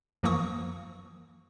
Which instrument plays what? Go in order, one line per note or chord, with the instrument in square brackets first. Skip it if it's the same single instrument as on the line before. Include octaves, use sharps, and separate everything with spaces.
[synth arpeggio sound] F#2 E3 F3 A#3 C#6 D#6